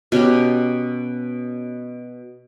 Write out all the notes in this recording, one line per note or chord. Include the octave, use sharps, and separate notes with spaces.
B2 C#4 G4 A#5